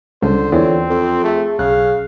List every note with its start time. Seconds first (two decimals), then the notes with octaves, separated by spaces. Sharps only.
0.22 C#2 D3 G3 C5
0.52 E2 C4 F4 C#5 D5
0.90 F2 A4
1.24 A3 G#4 E5
1.59 B1 C#3 F5 F#6